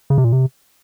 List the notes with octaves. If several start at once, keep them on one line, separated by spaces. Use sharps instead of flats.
C#3
C3
A#2
C3